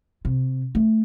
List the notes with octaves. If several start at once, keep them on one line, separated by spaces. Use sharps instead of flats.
C3
A3